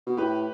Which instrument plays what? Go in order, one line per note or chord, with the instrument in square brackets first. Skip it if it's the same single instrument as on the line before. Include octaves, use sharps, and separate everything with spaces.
[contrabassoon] B2
[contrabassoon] A2 [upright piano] G4 B4